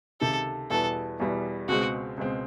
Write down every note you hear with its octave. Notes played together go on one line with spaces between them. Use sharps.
C#2 C3 D#3 A4
E2 B2 G3 B3 E4 A4
E2 B2 G3 B3 E4
C#2 B2 G#3 C4 F#4
C#2 B2 G#3 C4